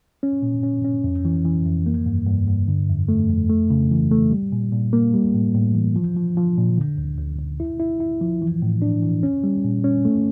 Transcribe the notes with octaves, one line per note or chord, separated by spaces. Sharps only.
C#4
A#2
C#4
C#4
F2
E3
E3
F2
A#3
G2
G2
G2
D3
F2
A3
F2
A3
C#3
E3
A3
G3
A#2
A#2
A#3
G3
A2
A2
E3
F3
F3
F3
A#2
D3
D2
D2
D2
E4
E4
E4
F3
E3
A2
D4
E3
C#4
G3
A#2
C#4
A3